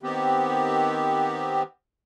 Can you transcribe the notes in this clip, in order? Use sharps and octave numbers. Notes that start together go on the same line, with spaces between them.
D#3 B3 C4 G4